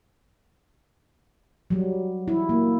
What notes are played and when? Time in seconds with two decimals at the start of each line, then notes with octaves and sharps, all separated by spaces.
1.70 F#3 G3
2.28 E4
2.49 A#3